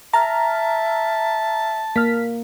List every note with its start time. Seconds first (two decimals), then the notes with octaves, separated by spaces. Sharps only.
0.14 E5 A5 A#5 F6
1.96 A#3 F6 B6